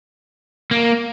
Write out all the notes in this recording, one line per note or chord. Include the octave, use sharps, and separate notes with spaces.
A#3